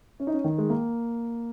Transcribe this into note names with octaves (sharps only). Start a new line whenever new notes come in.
C#4
D#4
C#4
D#3
G#3
A#3